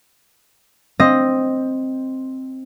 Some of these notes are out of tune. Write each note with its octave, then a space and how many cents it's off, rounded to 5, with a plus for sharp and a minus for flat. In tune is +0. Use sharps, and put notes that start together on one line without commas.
C4 +5 D#5 +0